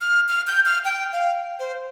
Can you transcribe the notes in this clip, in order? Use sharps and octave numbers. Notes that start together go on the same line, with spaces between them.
F6
F6
G6
F6
G5
F5
C5